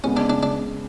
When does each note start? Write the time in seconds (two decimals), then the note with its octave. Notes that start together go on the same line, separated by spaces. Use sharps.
0.04 C#3 G#3 B3 C#4
0.17 D4
0.30 D4
0.43 D4